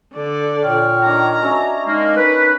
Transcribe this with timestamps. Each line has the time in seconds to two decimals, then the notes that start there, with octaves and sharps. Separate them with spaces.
0.14 D3 D5
0.63 A#2 C#5 G5 F6
1.04 D#3 D4 A#5
1.42 C#4 F#4 E5 A5
1.86 G#3 A#3 D#4
2.17 A#4 B4